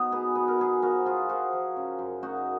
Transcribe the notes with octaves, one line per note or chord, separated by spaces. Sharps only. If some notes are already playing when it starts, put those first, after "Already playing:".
Already playing: F#3 B3 D#4
B2 G#4 B4
B2 B4
A#4
F#3 G#4 B4
F3 F#4 A#4
F3 F4 G#4
F3 F#4 A#4
F3
C#3
F#2
C#3 D#4 F#4